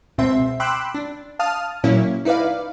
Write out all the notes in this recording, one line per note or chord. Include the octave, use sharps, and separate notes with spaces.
C#2 B2 C4 E5 C6
G5 B5 C6 D6 E6 F#6
D4
F5 A5 D#6 F6
A#2 F#3 A#3 C#4 E4
D#4 E4 B4 D5 F5